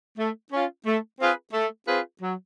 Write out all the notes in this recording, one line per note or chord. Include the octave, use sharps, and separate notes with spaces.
A3
C#4 F4
A3
C4 F4 G#4 B4
A3
C4 F4 G#4 B4
F#3